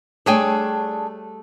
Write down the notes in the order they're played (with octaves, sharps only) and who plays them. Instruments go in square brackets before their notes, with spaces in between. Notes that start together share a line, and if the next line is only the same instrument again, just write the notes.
[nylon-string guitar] G3 A3 C#5 [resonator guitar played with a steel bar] D4 G#4 G5